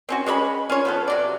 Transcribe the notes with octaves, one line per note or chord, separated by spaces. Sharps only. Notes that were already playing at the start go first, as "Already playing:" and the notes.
C4 C#4 F#4
G#3 C#4 C#5 B5
C#4 F4 C#5
F3 B3 A4
C3 F#3 D5